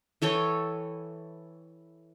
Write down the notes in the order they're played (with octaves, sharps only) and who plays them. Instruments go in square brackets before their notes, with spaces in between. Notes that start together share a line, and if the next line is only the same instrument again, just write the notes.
[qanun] E3 A4 C#5 G5